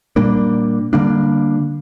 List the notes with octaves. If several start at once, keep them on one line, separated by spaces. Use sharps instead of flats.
A#2 G3 A#3 D4
D3 G3 A#3 D4